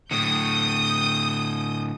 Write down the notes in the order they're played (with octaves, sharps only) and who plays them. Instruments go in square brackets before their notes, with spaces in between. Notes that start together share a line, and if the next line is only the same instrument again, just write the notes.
[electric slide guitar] A2 D3 [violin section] D#6 G6